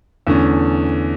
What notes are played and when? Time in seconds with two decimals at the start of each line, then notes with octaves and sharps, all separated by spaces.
0.27 E2 D3 A3 C#4